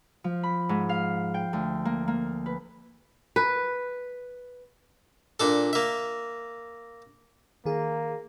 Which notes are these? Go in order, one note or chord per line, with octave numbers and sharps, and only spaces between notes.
F3
B5
G#2
F5
G5
D2
A#3
A#3
B4
B4
A#2 D4 A4
A#3 E5
D#3 A#3 G#4